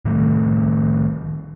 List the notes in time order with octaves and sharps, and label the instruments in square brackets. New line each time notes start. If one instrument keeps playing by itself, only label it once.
[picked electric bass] A2 D#3 G3 A3